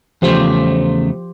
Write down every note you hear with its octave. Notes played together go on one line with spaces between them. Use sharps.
E2 C#3 F3 A3 G4 C5